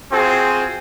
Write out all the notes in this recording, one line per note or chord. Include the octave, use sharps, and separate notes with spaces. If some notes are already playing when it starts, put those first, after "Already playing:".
C4 F4 F#4 G#4 C5